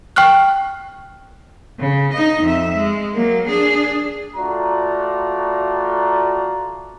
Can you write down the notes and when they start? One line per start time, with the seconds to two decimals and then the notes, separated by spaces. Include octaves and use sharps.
0.16 G5 C#6 F6 F#6
1.79 C#3
2.13 D#4 D#5
2.43 F2 E5
2.76 G#3
3.14 F#3 A#3
3.47 D4 G#4
4.36 A3 F4 F#4 D5 A#5